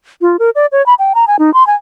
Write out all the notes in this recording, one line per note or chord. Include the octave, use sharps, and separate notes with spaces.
F4
A#4
D5
C#5
B5
G5
A#5
G#5
D#4
C6
G#5